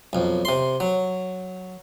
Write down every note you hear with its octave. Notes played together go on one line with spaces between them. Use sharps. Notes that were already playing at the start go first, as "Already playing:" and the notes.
B1 F2
C3 C6
F#3